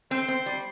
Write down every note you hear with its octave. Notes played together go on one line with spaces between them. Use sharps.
C4 C5
C4
G3